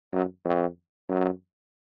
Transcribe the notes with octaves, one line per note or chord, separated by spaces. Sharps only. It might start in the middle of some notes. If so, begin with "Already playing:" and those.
F#2
F2
F#2